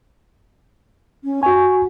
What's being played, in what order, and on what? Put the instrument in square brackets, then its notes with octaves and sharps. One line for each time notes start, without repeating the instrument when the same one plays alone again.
[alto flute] C#4
[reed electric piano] F#4 G#5 [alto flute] C#6